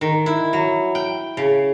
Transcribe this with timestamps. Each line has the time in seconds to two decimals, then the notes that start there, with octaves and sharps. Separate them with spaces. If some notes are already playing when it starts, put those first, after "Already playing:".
0.01 D#3
0.26 E4
0.53 F#3
0.95 G5
1.37 C#3